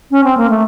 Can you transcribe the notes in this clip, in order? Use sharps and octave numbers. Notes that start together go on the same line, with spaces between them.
C#4
C4
A#3
A3